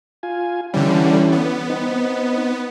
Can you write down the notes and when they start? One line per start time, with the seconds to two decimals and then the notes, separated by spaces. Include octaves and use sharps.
0.23 F4 G#5
0.74 D3 E3 G3 C#4
1.32 B3
1.69 C4 D#4